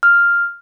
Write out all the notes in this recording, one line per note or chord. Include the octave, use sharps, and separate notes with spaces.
F6